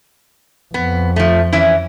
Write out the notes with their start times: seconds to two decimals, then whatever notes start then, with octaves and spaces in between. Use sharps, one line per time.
0.74 F2 B3
1.16 F3 A3
1.53 E3 C#4 E4